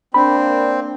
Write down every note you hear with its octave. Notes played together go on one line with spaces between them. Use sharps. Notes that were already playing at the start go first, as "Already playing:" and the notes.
A#3 C4 D4 B5